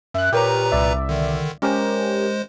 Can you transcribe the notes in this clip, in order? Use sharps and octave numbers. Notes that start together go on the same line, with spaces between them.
F#2 E5 F#6
A#2 G4 A#4 B4 C#5 A#5
C2 D5 E5
D3 D#3
G#3 C#4 G4 A#4 C5